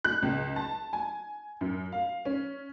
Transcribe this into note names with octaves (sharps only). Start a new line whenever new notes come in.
F#6
C#2
A5
G#5
F#2
F5
C#4